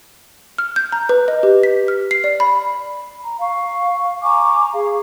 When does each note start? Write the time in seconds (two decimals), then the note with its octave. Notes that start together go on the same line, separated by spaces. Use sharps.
0.58 F6
0.76 G6
0.92 A#5
1.09 B4
1.28 D#5
1.43 G4
1.63 B6
1.88 F6
2.11 C7
2.24 D5
2.40 B5
3.23 A#5
3.41 F5 C#6
4.23 G#5 A#5 C#6 D6
4.72 G#4 F5